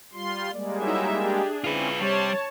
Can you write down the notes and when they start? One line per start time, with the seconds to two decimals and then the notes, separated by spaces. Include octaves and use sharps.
0.13 G3 F4 C6
0.51 G3 G#3 A#3 D5
0.81 F#3 D#4 E4 E5
1.23 D4 G4 G#4
1.64 C4 C#4 E4 F4 B4
2.01 C3 G3 C#5 A5 C6